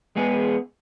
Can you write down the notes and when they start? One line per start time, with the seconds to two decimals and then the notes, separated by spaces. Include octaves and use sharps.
0.16 G#3 B3 G#4